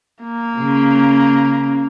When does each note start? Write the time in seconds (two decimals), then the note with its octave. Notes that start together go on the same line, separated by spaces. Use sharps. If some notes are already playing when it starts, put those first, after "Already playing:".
0.23 A#3
0.56 C#3